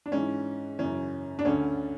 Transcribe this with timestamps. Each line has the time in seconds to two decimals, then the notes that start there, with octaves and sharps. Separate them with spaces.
0.06 D4
0.12 G#2 E3 C#4
0.79 F#2 C#3 E3 C#4
1.39 D4
1.45 D2 D3 C#4